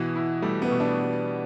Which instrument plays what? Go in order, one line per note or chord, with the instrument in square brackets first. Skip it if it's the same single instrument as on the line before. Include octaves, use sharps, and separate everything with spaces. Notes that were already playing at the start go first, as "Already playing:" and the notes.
Already playing: [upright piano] B2 [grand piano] E3
[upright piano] E4
[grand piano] G3 [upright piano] A3
[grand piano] B3
[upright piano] B2
[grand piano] D4
[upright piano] B2